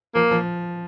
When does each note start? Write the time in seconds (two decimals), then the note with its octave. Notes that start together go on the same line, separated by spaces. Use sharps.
0.15 F3 A#3
0.31 F3